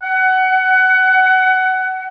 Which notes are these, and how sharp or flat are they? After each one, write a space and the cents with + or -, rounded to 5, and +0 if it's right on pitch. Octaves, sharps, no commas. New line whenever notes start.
F#5 +20